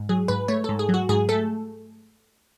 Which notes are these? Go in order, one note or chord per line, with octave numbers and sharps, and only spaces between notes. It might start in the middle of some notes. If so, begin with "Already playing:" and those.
Already playing: G#2
F#3 G#4
G#2 B4
A3 C#5
G#2 A4
G#4
F#3
F#4
G#2 G#4
A3 A4